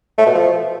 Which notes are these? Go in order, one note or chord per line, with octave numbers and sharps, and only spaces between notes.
A3
B2
F3